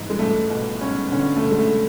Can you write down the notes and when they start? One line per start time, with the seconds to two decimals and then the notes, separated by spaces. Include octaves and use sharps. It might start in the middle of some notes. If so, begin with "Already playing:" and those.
Already playing: G#2 E3
0.10 G#3
0.19 C#2 A3
0.50 B2
0.81 C#2 C#4
1.12 D3 C#4
1.36 A3
1.43 D3
1.51 G#3
1.59 A3